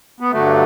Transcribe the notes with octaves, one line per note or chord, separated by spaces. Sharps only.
B3
G2 D3 F#3 A3